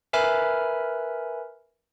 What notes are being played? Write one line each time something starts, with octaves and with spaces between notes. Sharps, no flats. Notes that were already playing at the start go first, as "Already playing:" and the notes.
A#4 B4 E5 G#5 B5 F6